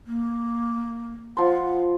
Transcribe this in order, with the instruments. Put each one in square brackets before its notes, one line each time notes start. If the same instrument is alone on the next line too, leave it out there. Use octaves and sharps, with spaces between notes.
[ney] A#3
[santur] F3 C6 [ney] F#5